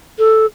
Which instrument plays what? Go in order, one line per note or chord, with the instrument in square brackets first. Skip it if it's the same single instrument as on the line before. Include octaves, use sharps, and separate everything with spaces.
[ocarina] A4